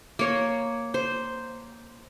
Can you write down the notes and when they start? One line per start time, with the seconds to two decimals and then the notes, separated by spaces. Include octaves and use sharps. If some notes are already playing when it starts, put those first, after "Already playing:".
0.19 A#3 C#5
0.94 C5